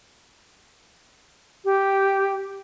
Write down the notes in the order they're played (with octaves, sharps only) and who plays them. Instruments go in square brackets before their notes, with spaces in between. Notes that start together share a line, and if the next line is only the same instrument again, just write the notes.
[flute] G4